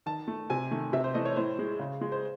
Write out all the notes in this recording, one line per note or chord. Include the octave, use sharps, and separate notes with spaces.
D#3 A5
A3
C3 G#5
D#3 A3
C3 E5
C5
E3 A3 D#5
C#5
A2 C5
G#3
C#3
G#3
C5